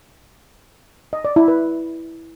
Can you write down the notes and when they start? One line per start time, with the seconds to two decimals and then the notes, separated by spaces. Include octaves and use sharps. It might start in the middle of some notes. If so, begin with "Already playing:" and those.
1.13 D#5
1.25 D5
1.36 E4
1.48 B4